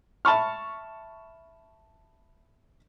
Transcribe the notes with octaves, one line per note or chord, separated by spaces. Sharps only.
E5 A5 B5 C#6 F6